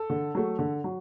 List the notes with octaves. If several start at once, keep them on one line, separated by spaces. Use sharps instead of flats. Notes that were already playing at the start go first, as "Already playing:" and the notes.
Already playing: A4
D3
F#3 A3
D3
F#3